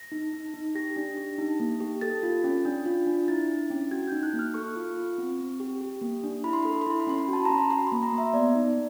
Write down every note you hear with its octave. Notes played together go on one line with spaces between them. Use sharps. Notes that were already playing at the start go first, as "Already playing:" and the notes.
Already playing: A#6
D#4
D#4
D#4
G4 A#6
D4
G4
D#4
A#3
G4
A4 A6
F4
C#4
D4
F4
D4
E4 A6
E4
C#4
F#4 G#6
D#4 G6
F#6
A#3
F6
A4 C#6
F4
F4
C4
C4
G4
G4
A#3
D4
E4 B5
C6
A4 B5
C6
B5
E4 C6
B5
C#4 C6
B5
F#4 A5
C#4 A#5
B5
F#4 C6
C6
A#3
A#5
A#3
E5
B3 D5
D#4